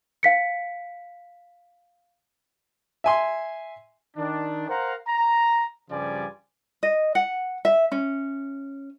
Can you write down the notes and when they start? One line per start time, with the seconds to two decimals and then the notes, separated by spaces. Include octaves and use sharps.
0.23 F5 B6 C#7
3.04 E5 G#5 C6
4.17 D#3 D4
4.69 A#4 C5 F5 F#5 A#5
5.07 A#5
5.90 G2 C#3 F3 G3 D5 G#5
6.83 D#5
7.15 F#5
7.65 E5
7.92 C#4